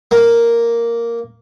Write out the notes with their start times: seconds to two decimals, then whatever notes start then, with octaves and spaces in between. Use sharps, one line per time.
0.11 A#3